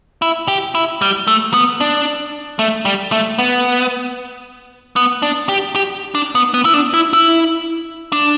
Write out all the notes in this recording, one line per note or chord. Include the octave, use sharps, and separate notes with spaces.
E4
G4
E4
G3
A3
B3
D4
A3
G3
A3
B3
B3
D4
G4
G4
D4
B3
B3
E4
D4
E4
E4
D4